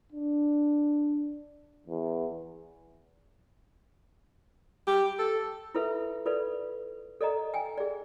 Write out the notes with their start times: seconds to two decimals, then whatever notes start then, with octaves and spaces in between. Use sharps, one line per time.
0.12 D4
1.87 E2
4.87 G4
5.19 A4
5.75 E4 F4 A4 B4 E5
6.26 F4 A4 B4 D5
7.21 A4 D5 D#5 A#5
7.54 G5 G#5
7.77 G#4 D5